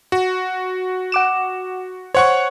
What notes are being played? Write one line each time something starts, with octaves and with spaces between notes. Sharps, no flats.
F#4
F#5 D6 E7
C5 C#5 F#5 C#6